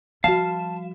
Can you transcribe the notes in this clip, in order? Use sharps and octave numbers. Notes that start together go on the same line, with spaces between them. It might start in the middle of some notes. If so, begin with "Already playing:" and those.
F3 G3 F#4 F5 A5 E7